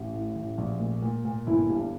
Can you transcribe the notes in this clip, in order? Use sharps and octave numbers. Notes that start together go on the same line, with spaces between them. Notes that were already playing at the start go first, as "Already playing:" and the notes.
Already playing: A1
A2
A1
A#1
A#2
A#2
A#2
G1 E3 E4
G2